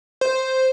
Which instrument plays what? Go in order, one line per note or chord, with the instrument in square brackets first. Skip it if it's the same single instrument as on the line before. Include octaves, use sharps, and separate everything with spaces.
[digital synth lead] C5